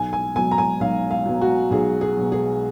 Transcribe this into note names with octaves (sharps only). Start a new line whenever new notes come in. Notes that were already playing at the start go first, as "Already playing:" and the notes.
Already playing: B1 G#5
G#5
B2 F#3 G#5
A#5
G#5
B1 F5
F5
B2 F#3
F#4
B1 G#4
G#4
B2 F#3
G#4